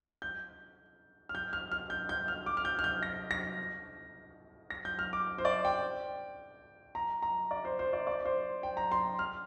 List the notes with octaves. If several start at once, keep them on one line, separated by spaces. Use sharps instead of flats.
G6
F6
G6
F6
F6
G6
G6
F6
D6
F6
G6
F6
G6
A#6
A#6
A#6
G6
F6
D6
C5
D5
G5
A#5
A#5
D5
C5
C5
D5
D5
C5
G5
A#5
C6
F6